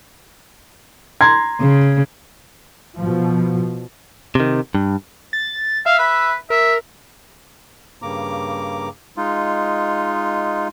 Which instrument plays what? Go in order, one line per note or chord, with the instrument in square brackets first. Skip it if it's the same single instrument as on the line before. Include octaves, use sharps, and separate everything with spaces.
[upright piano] A#5 C6 G#6
[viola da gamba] C#3
[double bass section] B2 F3
[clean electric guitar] C3 D#3
G2
[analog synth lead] A6
[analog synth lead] E5 [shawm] F5
[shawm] B4
[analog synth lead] A#4 [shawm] E5
[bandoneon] G2 C#3 A#3 A#5 D6
G#3 D#4 F4